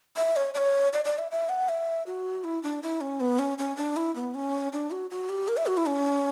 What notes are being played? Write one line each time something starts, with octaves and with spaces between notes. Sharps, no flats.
E5
C#5
D5
C#5
D5
D5
E5
E5
F#5
E5
F#4
E4
D4
E4
C#4
B3
C#4
C#4
D4
E4
B3
C#4
D4
F#4
F#4
G4
A#4
E5
F#4
E4
C#4